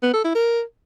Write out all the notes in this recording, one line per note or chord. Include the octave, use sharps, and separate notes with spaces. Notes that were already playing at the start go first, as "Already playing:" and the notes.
B3
A4
E4
A#4